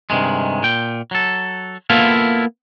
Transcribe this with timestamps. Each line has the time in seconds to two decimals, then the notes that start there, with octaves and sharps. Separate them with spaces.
0.10 G2 C3 D#3 G#3
0.63 A#2 G5
1.11 F#3 A4
1.90 A#3 B3 E4 F4 A4 F5